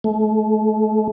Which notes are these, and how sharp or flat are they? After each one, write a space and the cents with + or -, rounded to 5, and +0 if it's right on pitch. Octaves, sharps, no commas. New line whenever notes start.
A3 -35